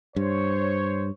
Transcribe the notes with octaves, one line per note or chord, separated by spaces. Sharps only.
G2 C5 C#5